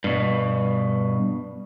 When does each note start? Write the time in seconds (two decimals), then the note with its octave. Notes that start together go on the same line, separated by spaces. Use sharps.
0.04 G2 B2